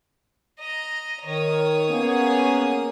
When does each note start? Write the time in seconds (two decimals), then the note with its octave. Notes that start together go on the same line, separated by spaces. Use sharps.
0.59 D#5 A#5
1.26 D#3 C#5 D#6
1.90 A#3 B3 C#4 G#4